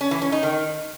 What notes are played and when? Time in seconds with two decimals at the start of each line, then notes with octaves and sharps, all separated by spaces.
0.01 C#4
0.11 E3
0.22 C#4
0.32 D#4
0.43 D#3